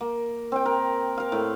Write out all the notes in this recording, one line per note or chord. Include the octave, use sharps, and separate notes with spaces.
A#3
C4 G5
A#4
A#4 F5
A2